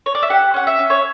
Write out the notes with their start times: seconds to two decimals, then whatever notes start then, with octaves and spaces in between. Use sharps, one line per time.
0.06 C#5
0.15 D5
0.23 E5
0.30 G4 F#5
0.54 C#4 F#5
0.67 E5
0.79 C#4
0.90 C#5